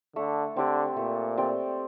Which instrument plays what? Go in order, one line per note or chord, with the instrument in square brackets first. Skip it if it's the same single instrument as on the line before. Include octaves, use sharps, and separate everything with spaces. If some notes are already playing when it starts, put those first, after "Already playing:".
[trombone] D3 [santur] A3
[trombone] D3 [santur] C4 G4 D5
[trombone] A#2 [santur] A3
[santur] C4 G4 D5